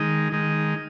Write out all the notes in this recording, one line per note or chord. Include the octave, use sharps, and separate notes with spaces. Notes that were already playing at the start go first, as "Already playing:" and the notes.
Already playing: D#3 G#3 D#4
D#3 G#3 D#4